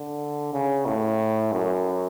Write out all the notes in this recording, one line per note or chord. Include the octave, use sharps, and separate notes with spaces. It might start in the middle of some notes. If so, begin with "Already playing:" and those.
Already playing: D3
C#3
A2
F#2